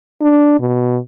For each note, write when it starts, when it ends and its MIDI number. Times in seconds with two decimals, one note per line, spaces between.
0.21 0.56 62
0.60 0.98 47